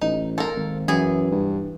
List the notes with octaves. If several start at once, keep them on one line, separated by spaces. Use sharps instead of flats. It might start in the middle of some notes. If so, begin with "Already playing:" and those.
A1 D#4
A#3 A4 A#4 C5
G#1
F#2 E3 B3 G#4
G2